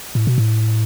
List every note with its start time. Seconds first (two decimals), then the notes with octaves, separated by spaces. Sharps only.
0.15 A2
0.27 B2
0.38 A2